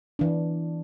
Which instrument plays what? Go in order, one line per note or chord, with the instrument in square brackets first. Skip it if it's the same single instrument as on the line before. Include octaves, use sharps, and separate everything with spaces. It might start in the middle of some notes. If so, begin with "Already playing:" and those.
[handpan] E3 D4